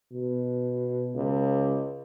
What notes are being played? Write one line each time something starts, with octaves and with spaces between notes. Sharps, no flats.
B2
C#2